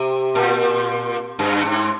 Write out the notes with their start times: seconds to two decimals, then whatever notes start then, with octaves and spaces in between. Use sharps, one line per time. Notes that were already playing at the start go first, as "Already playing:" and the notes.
Already playing: C3
0.35 A#2
1.39 G2
1.65 G#2